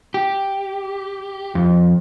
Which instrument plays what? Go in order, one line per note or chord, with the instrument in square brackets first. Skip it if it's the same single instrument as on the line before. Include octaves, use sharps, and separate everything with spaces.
[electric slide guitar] G4
F2